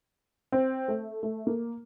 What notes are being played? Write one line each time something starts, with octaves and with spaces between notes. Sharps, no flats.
C4
A3
A3
A#3